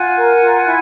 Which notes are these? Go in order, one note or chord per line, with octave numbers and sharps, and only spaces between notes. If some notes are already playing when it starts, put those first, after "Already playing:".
Already playing: F4 F#5 G#5
A#4
F4
E4